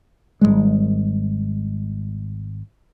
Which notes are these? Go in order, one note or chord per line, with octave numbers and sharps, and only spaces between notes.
G#1 F2 G3 G#3